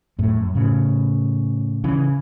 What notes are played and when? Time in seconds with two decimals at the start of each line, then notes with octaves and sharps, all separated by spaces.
0.19 F#2 A2
0.37 F#2
0.55 A2 C#3
1.84 C#3 E3